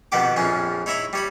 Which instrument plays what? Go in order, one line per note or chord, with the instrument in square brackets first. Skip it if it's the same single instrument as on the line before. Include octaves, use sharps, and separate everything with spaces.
[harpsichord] F2 B2 D#3 F#4 G4 D6
A#1 F2 F3 C#4 G#4
D#4 E4 C#5 E5 A#5 B5
G3 C#5 B5